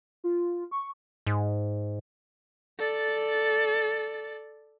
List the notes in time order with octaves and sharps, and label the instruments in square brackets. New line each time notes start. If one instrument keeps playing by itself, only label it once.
[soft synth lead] F4
C#6
[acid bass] G#2
[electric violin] A4 D5